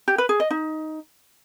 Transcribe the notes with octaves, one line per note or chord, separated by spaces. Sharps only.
G4
B4
G#4
D#5
D#4